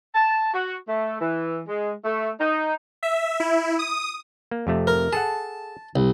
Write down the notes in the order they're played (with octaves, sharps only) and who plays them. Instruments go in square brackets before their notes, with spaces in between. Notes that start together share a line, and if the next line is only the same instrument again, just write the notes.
[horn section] A5
F#4
A3
E3
G#3
A3
D#4
[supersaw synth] E5
E4
D#6
[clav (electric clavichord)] A#3
F2 C3 A3
[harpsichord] A#4
[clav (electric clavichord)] G#4 A4 F#5 [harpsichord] A5
[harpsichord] C2